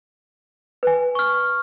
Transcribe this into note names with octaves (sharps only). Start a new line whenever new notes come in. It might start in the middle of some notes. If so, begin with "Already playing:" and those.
B4 G#5
C#6 F6